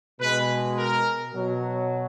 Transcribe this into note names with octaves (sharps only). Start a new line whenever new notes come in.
B2 G#3 B4
A#4
B2 F#3